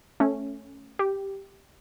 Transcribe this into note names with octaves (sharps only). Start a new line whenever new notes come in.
A3 C#4
G4